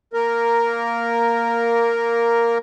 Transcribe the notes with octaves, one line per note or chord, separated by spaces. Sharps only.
A#3 A#4